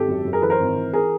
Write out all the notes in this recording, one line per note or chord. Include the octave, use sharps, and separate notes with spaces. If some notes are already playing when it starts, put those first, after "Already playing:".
Already playing: G#1 G4 A4
F#2
F#2
G#4 A#4
E3 A4 B4
A#4 C5
G#1
E3
G#4 A#4